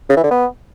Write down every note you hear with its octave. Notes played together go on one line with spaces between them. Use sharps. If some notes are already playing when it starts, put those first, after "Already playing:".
C#3
E3
D3
B3